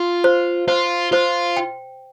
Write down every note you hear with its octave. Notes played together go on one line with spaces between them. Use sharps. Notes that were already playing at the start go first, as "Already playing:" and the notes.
Already playing: F4
C5
F4 C5
F4 C5
G5